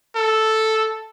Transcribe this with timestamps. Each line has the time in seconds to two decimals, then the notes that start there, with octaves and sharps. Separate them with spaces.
0.16 A4